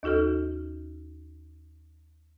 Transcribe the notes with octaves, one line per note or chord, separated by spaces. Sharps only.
D#2 D#4 F#4 A4 F6